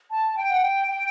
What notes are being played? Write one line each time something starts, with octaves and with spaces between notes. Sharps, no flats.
A5
G5
F#5
G5
G5